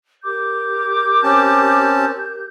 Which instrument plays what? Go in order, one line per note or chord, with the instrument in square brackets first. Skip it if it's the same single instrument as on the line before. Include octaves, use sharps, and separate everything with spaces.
[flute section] G4 A#4 G6 [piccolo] D6
[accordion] C4 C#4 A5